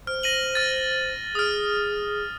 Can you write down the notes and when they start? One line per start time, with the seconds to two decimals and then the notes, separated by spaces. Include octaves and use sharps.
0.07 C5 F6
0.23 A#6 D#7 F#7
0.55 F6 A6
1.35 G#4 D#6 F6